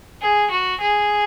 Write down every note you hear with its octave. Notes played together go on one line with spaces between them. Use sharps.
G#4
F#4
G#4